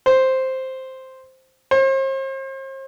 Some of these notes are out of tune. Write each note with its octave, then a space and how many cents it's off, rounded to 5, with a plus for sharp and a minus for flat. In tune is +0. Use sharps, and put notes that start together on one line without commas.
C5 +0
C5 +40